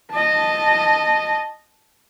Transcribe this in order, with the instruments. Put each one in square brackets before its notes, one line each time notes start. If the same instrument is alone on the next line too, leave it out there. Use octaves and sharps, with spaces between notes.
[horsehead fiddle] D#5 A5